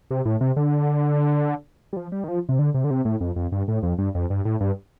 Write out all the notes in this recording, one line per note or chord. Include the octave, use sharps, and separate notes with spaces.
C3
A2
C3
D3
G3
F3
G3
D#3
F3
C3
D3
C3
D3
C3
A2
F2
F2
G2
A2
F2
G2
F2
G2
A2
G2